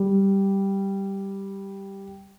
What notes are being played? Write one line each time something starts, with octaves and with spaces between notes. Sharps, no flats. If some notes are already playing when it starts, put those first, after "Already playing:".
Already playing: G3